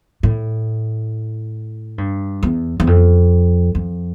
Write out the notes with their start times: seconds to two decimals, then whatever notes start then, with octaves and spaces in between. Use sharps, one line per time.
0.23 A2
1.98 G2
2.43 E2
2.80 E2
2.87 F2
3.75 F2